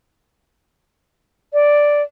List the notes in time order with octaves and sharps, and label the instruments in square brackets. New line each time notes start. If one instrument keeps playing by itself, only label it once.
[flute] D5